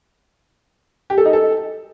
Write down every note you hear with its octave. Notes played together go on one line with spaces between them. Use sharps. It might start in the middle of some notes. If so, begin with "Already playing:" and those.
G4
A4
D#4
A4